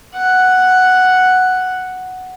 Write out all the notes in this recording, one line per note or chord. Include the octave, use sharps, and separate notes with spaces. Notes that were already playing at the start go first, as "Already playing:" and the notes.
F#5